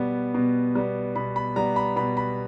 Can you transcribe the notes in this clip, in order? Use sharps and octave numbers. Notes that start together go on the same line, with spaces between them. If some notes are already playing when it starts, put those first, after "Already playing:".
Already playing: B2 G3 B3
B2
G3 B3
B2 B5
B5
G3 B3 A#5
B5
B2 B5
B5